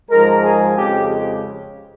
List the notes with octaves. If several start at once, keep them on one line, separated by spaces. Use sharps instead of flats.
G#2 F3 G#3 A#4
G#4
F2 C#3 G#3 G4